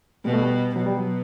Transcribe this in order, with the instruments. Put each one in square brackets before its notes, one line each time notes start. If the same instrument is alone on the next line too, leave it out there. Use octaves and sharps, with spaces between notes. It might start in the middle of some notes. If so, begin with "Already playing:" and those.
[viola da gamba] B2 [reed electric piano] G3
[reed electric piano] A3
G3
[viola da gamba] B2 [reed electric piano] F#3
[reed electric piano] G3
F#3